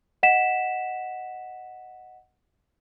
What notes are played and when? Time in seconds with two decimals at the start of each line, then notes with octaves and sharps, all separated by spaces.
0.23 D#5 F#5 B6 E7